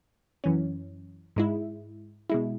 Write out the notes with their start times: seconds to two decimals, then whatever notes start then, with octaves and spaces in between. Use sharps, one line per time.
0.44 F#2 E3 C#4
1.36 G#2 G#3 E4
2.30 B2 G#3 E4